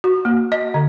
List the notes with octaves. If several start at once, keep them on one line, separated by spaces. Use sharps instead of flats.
F#4
A#3
D#5
D3